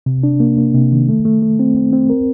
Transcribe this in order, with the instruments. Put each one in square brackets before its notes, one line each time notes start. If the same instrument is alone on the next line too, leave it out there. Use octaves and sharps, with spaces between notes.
[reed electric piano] C3
D4
A#3
A#3
C3
D#3
A3
A3
A3
C4
C4
C4
A#4